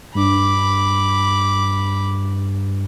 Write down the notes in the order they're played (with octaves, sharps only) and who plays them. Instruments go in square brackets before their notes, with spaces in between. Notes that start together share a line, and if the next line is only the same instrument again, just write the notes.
[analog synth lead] G2 [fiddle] B5 D6